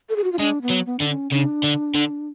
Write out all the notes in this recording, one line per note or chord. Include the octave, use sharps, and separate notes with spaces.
A4
G#4
F#4
F4
G#3 D4
B3
F#3
B3
D3 D4
C#4
C#3 D4
D3
D3